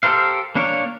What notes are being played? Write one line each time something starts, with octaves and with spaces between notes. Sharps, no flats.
G4 A4 A#4 C5 F5
A#3 D4 A#4 C#5